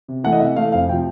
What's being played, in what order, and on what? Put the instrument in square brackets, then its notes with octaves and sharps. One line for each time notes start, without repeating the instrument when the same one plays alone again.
[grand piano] C3
E3 A3 F#5
D#5
C3 E5
E3 A3 F5
F2 F5
C3 G5
F3